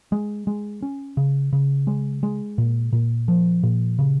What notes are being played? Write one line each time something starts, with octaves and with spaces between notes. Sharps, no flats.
G#3
G#3
C#4
C#3
C#3
G#3
G#3
A#2
A#2
F3
A#2
C#3